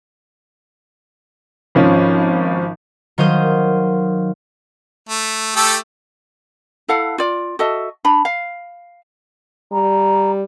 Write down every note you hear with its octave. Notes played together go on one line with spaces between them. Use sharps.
G#1 F3 C#4
D#3 F#3 C5 F5 D#6 G6
A3
A3 G4 A4
E4 A4 F5 F#5
F4 D5
F#4 A4 D#5 E5
D4 B5
F5
G3 A#5